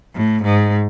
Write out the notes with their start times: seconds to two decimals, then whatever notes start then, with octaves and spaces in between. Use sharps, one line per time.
0.15 A2
0.43 G#2